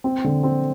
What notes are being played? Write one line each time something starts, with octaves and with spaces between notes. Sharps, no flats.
C4
D3
C4